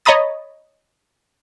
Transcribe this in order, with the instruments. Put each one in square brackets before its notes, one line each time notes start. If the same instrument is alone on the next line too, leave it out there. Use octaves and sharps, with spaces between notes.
[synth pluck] C#5 D#5 A#5 B5 D#6 A6